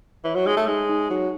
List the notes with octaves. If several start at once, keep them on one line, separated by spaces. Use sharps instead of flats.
E3 C#5
F#3
G#3 D#4
A3
G#3 D#4
D#4
F#3 D#4